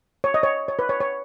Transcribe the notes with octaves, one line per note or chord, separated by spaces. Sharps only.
C#5
D#5
C#5
C#5
B4
C#5
C#5